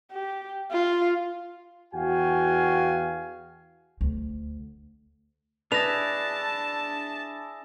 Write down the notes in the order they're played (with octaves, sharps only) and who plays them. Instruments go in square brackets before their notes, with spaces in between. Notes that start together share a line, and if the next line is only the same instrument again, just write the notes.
[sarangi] G4
F4
[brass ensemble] E2 F#4 F5 G5 G#5
[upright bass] D2
[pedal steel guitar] D4 E4 G#4 [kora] B4 [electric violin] A5 [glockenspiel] A#6 F7